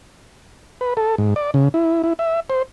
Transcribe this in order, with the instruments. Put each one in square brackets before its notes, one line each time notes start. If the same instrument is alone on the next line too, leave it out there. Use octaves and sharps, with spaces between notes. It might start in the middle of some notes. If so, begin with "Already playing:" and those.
[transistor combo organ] B4
A4
G#2
D5
C#3
E4
E4
E5
C5